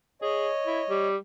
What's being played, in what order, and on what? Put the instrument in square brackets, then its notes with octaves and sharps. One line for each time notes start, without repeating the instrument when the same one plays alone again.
[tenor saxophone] G#4 [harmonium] C#5 D#5
[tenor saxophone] E4
G3